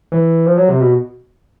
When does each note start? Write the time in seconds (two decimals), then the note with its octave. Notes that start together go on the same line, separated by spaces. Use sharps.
0.12 E3
0.46 F3
0.57 F#3
0.69 C3
0.80 B2